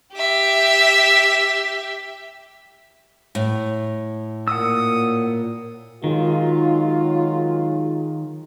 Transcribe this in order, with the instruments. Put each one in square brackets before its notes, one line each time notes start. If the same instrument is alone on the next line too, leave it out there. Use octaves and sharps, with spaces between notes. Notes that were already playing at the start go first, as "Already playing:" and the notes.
[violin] G4 E5
[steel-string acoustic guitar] A2
[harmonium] A#2 [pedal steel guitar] F#5 E6 [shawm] D#6
[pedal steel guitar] D#3 [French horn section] F#3 G#3 F4